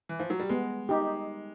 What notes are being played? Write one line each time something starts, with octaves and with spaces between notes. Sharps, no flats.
E3
F3
F#3
G3
G#3 B3
D#4 G4